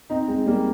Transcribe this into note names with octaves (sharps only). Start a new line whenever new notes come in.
C4 D#4
G#3 C4
G3 A#3